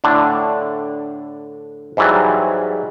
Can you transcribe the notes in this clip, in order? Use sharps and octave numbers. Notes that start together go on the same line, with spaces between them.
A2 D3 D4
G#2 E3 F#3 G3